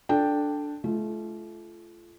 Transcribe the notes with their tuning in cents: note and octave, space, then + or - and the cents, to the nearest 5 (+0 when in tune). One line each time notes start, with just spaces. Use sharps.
D4 +0 A4 +0 G5 +0
A3 -35 F4 -30